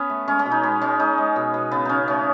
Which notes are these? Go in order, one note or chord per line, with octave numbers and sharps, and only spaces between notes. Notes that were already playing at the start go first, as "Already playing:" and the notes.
Already playing: B3 C#4
A3
G#3 C#4
C#4
B2
D#4
G#3 B3
G#3 C#4
G#3 D#4
G#3
B2
B2
C#3 B3
C#3 C#4 D#4
A3 C#4